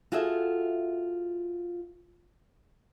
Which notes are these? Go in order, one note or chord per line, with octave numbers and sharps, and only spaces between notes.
F4 F#4 G#4 A4 E5